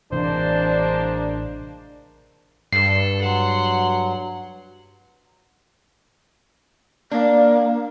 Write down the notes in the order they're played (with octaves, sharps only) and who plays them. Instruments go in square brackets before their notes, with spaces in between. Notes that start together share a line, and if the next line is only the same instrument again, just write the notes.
[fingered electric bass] A1 C3 E3 [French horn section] G#3 A#3 D4 [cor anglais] C5
[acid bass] G2 [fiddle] A4 [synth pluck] C7
[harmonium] F#3 [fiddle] F#5 C6
[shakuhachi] A#3 [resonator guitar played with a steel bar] D4